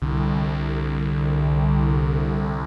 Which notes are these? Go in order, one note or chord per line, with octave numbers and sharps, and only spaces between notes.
C2 D3